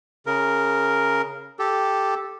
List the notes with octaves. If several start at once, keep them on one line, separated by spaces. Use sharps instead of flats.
C#3 A#4
G4 A4